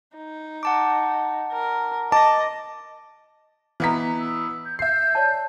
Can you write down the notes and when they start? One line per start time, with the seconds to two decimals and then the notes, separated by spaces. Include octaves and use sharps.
0.16 D#4
0.63 F#5 A5 D6
1.52 A#4
2.12 D#5 A5 D6 A#6
3.80 E3 B3 B4 D#5 A#5 B6
4.19 E6
4.65 G6
4.79 E5 G6 C7
5.15 C#5 D5 A5